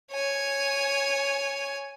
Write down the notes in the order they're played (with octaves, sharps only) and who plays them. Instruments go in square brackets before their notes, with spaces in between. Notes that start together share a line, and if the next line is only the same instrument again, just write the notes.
[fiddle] C#5 G#5